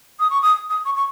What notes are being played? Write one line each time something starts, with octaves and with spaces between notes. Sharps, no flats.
D#6
C#6
D#6
D#6
C#6
C#6